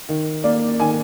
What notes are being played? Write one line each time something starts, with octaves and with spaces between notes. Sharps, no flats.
D#3
A#3 D5
D#3 G#5